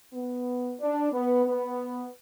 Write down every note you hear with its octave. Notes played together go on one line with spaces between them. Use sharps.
B3
D4
B3
B3